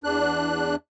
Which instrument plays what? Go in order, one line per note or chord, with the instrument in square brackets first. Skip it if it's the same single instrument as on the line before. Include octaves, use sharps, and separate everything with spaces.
[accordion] E2 D4 F#6